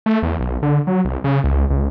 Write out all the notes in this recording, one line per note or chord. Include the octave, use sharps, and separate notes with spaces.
A3
E2
B1
D3
F#3
C2
C#3
C#2
C#2